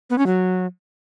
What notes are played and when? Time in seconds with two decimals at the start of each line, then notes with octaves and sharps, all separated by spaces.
0.10 B3
0.18 C#4
0.26 F#3